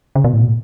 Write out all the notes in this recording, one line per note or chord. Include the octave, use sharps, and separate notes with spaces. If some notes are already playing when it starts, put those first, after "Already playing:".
C#3
B2
A2
B2
A2